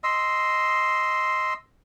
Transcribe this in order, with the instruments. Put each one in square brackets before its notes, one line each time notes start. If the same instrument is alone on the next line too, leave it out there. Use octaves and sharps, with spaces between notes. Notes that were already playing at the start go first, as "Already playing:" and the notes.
[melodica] D#5 C6 E6